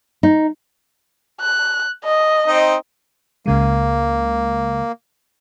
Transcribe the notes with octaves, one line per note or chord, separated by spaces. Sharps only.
D#4
F#6
D#5
C4 D#4
C#2 C#3 G#3 A#3